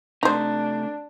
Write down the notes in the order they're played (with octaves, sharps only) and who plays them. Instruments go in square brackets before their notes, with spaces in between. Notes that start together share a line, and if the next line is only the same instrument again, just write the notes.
[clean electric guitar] C3 A3 [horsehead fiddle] D4 [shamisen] D#4 C5